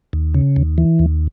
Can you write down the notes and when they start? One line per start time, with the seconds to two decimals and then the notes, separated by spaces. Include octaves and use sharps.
0.13 D#2
0.34 C#3
0.56 D#2
0.78 E3
0.99 D#2